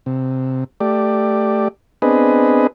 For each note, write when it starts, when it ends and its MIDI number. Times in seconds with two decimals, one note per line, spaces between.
0.06 0.64 48
0.80 1.68 57
0.80 1.68 67
0.80 1.68 74
2.02 2.67 59
2.02 2.67 60
2.02 2.67 62
2.02 2.67 68
2.02 2.67 71
2.02 2.67 75